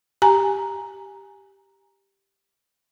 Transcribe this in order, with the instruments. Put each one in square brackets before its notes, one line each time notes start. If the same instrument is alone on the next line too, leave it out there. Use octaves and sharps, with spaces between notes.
[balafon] G4 G#5 A#5